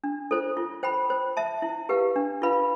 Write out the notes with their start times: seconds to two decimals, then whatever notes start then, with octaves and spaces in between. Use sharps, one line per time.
0.04 D4
0.31 F4 A4 C5
0.57 F4
0.83 C5 G5 B5
1.10 C5
1.37 E5 A5
1.62 E4
1.89 G4 B4 F5
2.16 D4
2.42 F4 B4 F5 B5